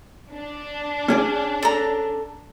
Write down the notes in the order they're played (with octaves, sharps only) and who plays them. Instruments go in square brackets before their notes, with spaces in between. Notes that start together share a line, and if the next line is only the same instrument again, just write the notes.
[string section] D4
[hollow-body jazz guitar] C#4 G#4 D5
[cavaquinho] A4 A#5